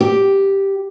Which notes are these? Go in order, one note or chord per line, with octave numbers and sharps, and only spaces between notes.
G4